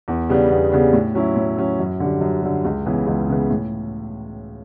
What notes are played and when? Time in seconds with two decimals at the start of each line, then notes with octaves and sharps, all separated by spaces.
0.08 E2
0.29 C#3 G3 B3 D4
0.50 E2
0.72 C#3 G3 B3 D4
0.93 A2
1.15 F#3 C#4 E4
1.36 A2
1.57 F#3 C#4 E4
1.80 F#2
2.00 D3 G3
2.21 F#2
2.43 D3 G3
2.65 C#2
2.86 C#3 E3 B3
3.07 C#2
3.29 C#3 E3 B3
3.50 A2